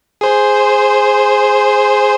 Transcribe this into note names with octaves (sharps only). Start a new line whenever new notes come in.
G#4 C5